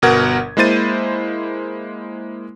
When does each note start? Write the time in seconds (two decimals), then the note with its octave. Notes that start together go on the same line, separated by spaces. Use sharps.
0.02 G1 B2 A#4 F#5 G#6
0.57 G#3 A#3 E4 C5 A6 D#7